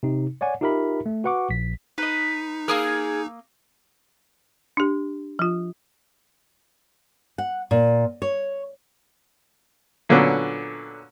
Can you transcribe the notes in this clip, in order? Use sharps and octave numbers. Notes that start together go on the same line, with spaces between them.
C3 D#4
C#5 D5 F#5 G#5
D#4 F4 G4 A#4 E5 B5
A3
F#4 B4 F#5 C#6 D6
A#1 B6
D#4 B4 D#5
A#3 G#4 A#4 D#6 E6
D4 G4
F3 F4
F#5
A#2
C#5
A#2 D3 F#3 B3 C#4